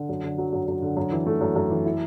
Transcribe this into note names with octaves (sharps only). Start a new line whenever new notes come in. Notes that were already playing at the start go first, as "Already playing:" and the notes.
Already playing: D3
F#2
D3
F#3
F#2
F#2
D3
F#2
E3
A3
F#2
F#2
E3
E4